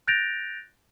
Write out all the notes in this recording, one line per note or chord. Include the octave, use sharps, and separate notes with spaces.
F#6 G6 A6 A#6 D7 F7